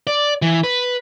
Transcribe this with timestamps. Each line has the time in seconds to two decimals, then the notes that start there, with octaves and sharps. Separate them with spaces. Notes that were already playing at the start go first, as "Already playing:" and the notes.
0.07 D5
0.42 E3
0.64 B4